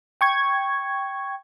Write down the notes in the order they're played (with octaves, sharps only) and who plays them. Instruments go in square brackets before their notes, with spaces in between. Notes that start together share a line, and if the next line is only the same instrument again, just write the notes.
[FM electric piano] G5 C#6 G#6